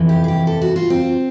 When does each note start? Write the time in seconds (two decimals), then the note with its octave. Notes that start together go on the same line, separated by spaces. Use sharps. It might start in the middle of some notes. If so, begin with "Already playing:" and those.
Already playing: F2 C3 E3
0.09 G4
0.24 G#4
0.28 G4
0.47 A4
0.62 F#4
0.76 F4
0.90 C4